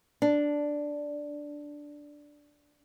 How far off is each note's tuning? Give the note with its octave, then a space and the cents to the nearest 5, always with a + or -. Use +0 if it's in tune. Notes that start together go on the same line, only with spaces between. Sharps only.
D4 +0